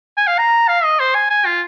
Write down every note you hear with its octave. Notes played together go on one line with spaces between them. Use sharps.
G#5
F5
A#5
F5
D#5
C5
G#5
G#5
F4